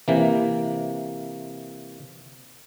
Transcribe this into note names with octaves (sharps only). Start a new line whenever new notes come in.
C3 E3 A#3